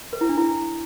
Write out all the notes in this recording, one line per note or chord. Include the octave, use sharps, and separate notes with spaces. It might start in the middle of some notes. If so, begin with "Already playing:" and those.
A#4
E4
D4
E4